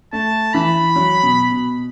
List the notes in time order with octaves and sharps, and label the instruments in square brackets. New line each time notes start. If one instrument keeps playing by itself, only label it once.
[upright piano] A3 [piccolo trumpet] A5
[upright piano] E3 [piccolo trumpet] B5
[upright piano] F#3
B2
B2